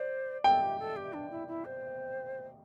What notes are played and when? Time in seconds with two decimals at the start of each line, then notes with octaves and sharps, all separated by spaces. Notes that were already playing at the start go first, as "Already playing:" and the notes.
Already playing: C5 D5
0.44 A4 G5
0.61 G4
0.79 A4
0.96 G4
1.13 D4
1.30 E4
1.47 E4
1.65 C5